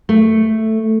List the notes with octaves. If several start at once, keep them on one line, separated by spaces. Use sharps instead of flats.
A3